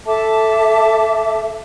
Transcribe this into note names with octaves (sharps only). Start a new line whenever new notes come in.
A4 E5 A5 D6